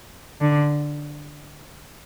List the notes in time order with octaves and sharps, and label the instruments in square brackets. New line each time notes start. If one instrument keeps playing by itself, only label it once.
[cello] D3